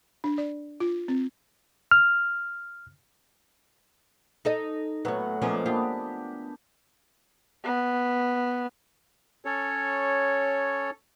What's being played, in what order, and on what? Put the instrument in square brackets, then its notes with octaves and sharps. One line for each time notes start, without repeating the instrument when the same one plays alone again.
[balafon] D4
D5
F4
C4
[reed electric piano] F6
[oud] D#4 A4 D#5
[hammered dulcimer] A2 F#3 F#5 [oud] B3 C#4
[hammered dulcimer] A#2 G#3 A#3 [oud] F3 B3 C#4
[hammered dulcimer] B3 D4 G4 [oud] F4
[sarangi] B3
[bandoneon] C#4 A4 C#5